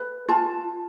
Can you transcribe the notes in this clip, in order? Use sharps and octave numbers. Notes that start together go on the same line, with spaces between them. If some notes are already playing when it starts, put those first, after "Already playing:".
Already playing: B4
F4 A5